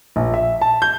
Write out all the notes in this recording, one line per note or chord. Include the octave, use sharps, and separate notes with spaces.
A#1
E5
A5
G6